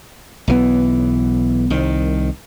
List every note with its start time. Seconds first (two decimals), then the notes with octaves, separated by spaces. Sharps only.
0.47 B1 E3 B3
1.70 C2 D#3